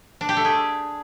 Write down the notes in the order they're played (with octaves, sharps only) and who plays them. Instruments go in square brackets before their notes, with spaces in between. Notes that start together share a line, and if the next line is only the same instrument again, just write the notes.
[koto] D4
G4
A3
G#4